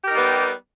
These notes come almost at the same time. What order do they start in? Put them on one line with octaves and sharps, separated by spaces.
G4 A#4 D#4 G3 B3